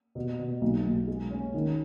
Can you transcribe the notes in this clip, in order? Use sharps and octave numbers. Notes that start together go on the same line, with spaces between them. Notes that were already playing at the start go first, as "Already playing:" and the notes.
B2
B2
B1
B1
G#3
C#4
D#3